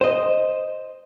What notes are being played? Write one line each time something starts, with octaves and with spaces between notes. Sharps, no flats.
C5 D#5